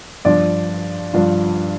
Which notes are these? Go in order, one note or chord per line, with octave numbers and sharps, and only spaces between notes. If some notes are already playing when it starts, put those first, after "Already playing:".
G2 F3 D4 F4 D5
G2 F3 D4 F4